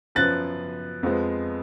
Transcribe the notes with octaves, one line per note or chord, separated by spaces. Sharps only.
F#2 F3 B3 F#6 A6
F2 F3 G#3 B3